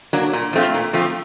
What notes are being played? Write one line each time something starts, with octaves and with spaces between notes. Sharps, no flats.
F#3 A#3 D4
A#2
F3 A3 C4 F4
A#2
F3 A3 C4 F4